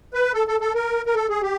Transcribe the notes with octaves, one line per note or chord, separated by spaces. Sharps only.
B4
A4
A4
A4
A#4
A#4
A4
G#4
G4